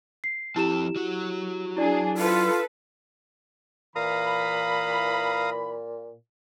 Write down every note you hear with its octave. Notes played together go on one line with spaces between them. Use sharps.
C7
F3 C4 E4 G4 A5 E7
F#3 F#4
D4 E4 G#4 D5
F4 A4 B4
A#2 E3 F5 A#5 B5 D#6